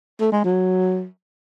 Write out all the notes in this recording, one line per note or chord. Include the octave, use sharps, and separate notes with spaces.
A3
G#3
F#3